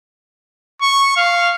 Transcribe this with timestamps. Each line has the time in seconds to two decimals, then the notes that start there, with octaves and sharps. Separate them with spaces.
0.82 C#6
1.17 F5